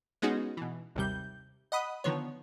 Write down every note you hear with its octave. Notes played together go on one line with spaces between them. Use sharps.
G#3 B3 C#4 D#4 F#4 G#4
B2 E3
G#1 D#2 C3 G3 G6
D#5 F#5 B5 D#6
D3 D#3 F3 B3 C#5